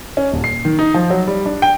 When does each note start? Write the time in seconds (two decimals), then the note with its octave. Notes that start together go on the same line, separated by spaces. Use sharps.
0.17 C#4
0.33 D#1
0.44 C7
0.65 D#3
0.79 D#4
0.94 F3
1.10 F#3
1.27 G3
1.46 D4
1.62 G5